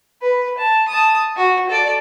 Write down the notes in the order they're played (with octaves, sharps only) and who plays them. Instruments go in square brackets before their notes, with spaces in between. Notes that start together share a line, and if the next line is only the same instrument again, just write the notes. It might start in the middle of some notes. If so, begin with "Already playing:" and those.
[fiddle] B4
A5
A5 D#6
F#4
A4 D5